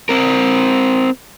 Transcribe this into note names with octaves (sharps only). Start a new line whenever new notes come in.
C4 A#4